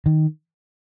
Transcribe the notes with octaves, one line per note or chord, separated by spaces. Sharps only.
D#3